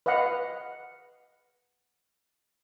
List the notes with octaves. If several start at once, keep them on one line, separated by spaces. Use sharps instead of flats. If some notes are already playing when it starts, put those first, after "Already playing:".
B4 D#5 F5 F#5